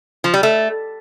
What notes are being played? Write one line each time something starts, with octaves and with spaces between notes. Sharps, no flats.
F3
G3
A3